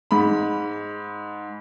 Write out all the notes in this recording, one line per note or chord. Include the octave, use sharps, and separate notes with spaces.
G#2 B5